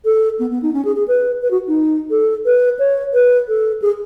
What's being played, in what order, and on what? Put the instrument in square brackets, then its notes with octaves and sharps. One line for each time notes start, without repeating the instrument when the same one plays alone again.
[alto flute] A4
B3
B3
D#4
C#4
G#4
G#4
B4
B4
F#4
D#4
A4
B4
C#5
B4
A4
G#4